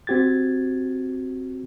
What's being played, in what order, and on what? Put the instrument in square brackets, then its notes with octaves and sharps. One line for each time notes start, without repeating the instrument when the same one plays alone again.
[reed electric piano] C4 F#4 G4 G#6 A6